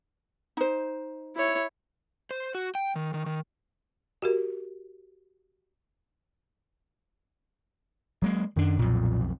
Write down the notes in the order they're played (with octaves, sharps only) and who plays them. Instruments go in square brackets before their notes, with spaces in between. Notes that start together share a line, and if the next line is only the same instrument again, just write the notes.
[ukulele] D#4 C5
[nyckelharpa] E4 C#5
[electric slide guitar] C5
F#4
G5
D#3
D#3
D#3
[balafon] F#4 G4 A#4
[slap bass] F#3 G#3 A#3
[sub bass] F#2 [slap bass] D#3 D4
[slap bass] B1 F2 [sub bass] A#2